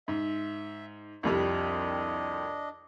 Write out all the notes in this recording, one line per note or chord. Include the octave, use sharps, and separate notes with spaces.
G#2 E5
C2 F2 G3 D4 D#5